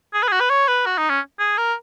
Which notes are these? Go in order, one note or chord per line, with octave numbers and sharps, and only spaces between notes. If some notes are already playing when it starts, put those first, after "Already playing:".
G#4
B4
G#4
F#4
B4
C#5
B4
F#4
D#4
C#4
G#4
A#4